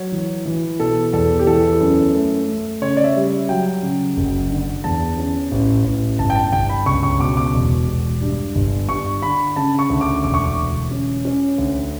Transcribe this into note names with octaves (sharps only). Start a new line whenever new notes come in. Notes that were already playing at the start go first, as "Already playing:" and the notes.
Already playing: F#3 C#5
E3
E3
B2 A4
E2 A4
G4
E3 A4
F#2
A3
A3
C#3 C#5
D5
E5
G3
F#3 G5
C#3
F#1
D3
E2 A5
C#4
A1
A1
G1 A5
G5
A5
G1 G5
B5
C#2 C#6
C#6
B2 D6
D6
E1
E1
G2
G1
G2 C#6
D3 B5
C#3 A5
C#6
D2
D6
E1 D6
C#6
D6
E1
C#4
C#4
D2